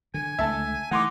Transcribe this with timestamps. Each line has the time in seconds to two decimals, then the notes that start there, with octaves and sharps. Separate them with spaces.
0.14 D3 G#5
0.39 C#2 D3 A3 E5 A5
0.91 E3 A3 D#4 F#5 C6 D6